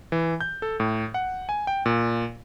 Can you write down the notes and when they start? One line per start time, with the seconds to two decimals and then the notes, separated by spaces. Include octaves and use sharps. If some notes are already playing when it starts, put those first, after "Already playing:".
0.12 E3
0.41 G6
0.62 A4
0.80 A2
1.14 F#5
1.49 G#5
1.67 G5
1.86 A#2